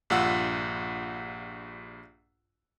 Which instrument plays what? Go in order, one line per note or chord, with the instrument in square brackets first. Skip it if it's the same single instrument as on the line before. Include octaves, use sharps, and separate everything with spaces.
[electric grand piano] A#1 G2 F4 F#5 E6